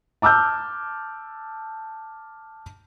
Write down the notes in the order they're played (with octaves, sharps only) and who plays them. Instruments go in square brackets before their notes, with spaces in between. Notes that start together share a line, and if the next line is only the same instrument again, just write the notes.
[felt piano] A5 D6 E6 F6 G6